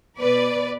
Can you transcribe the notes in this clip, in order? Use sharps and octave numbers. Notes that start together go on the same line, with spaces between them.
B2 B4 D5